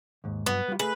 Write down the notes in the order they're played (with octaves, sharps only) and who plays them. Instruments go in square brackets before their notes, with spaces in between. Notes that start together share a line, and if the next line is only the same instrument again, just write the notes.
[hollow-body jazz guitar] D#2 G#2
[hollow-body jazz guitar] G2 F#3 [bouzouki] B3
[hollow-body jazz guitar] G3 F4
[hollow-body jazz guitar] A3 G#4 [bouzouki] B4